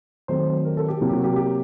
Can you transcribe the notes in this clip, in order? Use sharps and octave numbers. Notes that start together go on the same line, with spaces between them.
D#3 F#3 A3 C4 C5
A#4
A4
G4
C3 F#3 A#3
G4
F#4
G4
G4